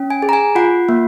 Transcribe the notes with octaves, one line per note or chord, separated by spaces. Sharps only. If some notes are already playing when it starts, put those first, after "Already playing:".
Already playing: C#4
G#5
G#4
A#5
G#5
F4 F#5
A#3